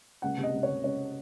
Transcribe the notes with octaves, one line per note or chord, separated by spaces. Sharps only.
C#2 F#5
C3
D#5
C#2
C#5
C3
C#2 C#5